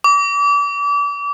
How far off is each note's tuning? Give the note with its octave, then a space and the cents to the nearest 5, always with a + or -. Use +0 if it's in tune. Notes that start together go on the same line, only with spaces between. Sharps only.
D6 -35